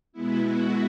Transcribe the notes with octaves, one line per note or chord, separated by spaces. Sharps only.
B2 G#3 B3 E4
F#4